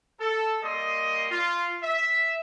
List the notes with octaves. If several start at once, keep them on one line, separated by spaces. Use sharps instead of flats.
A4
G3 A#3 D#5 C6 D#6
F4
E5